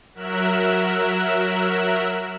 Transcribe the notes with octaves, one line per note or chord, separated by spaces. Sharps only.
F#3 A#4 E5 F#6 E7